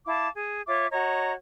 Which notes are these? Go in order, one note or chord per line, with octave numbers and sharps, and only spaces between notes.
E4 F5 A5 D6
G#4
F4 C#5 E5 D6
F#4 C#5 D#5 A#5